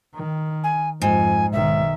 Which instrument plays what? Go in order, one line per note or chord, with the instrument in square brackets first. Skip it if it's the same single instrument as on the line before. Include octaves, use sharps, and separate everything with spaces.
[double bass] D#3
[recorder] G#5
[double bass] F2 [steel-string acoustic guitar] G#2 [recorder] G#5
[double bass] B1 D#3 [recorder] E5